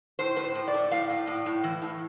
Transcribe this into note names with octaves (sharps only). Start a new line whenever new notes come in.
A2 C5
A2 B4
C5
A2
D5
A3
A2 F5
A2
A2
A2
E3
A2